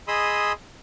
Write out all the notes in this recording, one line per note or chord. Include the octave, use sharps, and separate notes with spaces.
G#4 D#5 B5 C6 D#6 E6